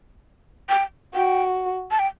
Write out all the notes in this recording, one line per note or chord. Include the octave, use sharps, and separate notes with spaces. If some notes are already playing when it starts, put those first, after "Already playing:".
G5
F#4 G5
A5
G5